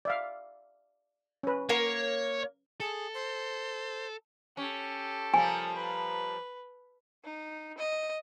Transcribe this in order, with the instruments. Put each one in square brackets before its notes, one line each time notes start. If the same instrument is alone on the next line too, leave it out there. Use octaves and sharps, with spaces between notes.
[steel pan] D5 E5 F5
C#4 B4
[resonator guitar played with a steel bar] A#3 A#4 F5 [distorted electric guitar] C#5
[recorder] G#4 [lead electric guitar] A4
[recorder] C5
[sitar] C#4 [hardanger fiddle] G4 A4
[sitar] F3 G3 A#3 [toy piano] G#5
[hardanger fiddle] B4
[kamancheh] D#4
D#5